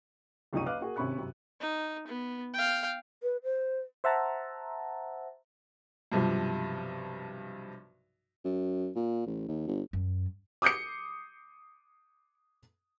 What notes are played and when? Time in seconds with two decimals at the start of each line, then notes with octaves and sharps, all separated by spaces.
0.53 F#1 C2 F3 D#4 C#6 D#7
0.66 B4 D#5 F5 D6 F6 F#6
0.80 A#3 F#4 G#4
0.96 G#1 C3 C#4 B5 C#6 F#6
1.18 F#2 C3
1.61 D#4
2.07 B3
2.54 F5 G5
3.23 B4
3.44 C5
4.04 C5 E5 F#5 A5 A#5
6.12 B1 G2 C3 F3
8.45 F#2
8.96 A#2
9.27 A1
9.48 D#2
9.67 G1
9.93 F#2
10.62 D6 D#6 G6 C7 C#7